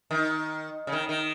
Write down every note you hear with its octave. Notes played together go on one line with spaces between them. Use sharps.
D#3
C#3
D#3
D#3